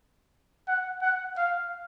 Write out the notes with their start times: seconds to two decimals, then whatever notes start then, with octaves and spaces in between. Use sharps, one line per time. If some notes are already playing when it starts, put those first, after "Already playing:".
0.68 F#5
1.02 F#5
1.37 F5